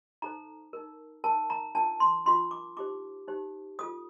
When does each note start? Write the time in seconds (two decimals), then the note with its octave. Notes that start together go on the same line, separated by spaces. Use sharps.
0.22 D#4 A4 C5 A#5
0.73 D#4 A#4
1.24 D#4 A#4 A5
1.50 A#5
1.75 D4 F4 A#4 A5
2.00 C6
2.26 D4 F4 A#4 C6
2.51 D6
2.77 D#4 G4 C5 D6
3.28 D#4 G4 C5
3.79 F4 A4 C5 D#6